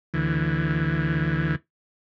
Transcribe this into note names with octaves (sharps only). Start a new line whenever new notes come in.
D2 E3